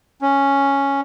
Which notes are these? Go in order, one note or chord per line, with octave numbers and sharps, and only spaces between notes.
C#4